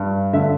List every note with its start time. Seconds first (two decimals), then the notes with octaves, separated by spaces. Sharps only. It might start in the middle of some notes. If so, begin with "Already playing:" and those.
Already playing: G2
0.33 D3 E5